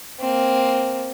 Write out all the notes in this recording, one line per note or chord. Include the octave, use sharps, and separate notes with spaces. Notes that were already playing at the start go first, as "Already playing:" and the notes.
A#3 C4